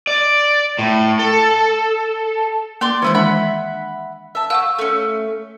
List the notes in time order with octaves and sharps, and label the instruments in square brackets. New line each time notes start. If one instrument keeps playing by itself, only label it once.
[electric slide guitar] D5
A2
A4
[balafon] A#3 [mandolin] D5 C6 D6
[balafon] D#3 E3 G#3 [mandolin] C#4 E4 C5
[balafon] D4 [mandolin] E5 F#5 B5
[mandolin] E5 A5
[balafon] F5 F#5 C#6 [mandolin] E6
[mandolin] A3 C#4